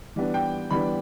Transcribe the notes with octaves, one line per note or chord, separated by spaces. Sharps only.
E3 G3 B3 D4
G5
E3 G3 B3 D4 B5